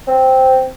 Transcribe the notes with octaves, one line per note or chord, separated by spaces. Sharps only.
C4